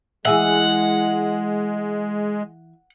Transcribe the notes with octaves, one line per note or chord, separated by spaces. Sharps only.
E3 G#3 G#4 E5 F#5